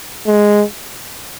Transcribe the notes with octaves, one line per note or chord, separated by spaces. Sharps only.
G#3